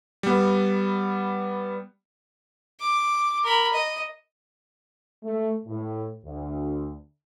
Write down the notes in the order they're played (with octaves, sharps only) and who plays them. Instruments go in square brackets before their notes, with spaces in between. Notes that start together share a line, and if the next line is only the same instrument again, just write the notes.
[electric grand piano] G3 B3
[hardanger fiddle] D6
A#4 B5
D#5
[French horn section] A3
A2
D2